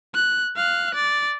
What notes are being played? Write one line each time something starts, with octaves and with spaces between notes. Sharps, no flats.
F#6
F5 F#6
D5